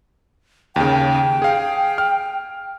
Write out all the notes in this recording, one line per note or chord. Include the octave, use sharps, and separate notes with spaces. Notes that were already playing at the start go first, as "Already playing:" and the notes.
D#2 C#3 G5
G#4 F5
F6